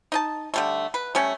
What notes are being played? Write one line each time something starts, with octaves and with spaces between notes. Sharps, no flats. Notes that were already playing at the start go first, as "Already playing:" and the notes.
D#4 D#5 A5
D3 G3 A3
B4
G3 A3 C#4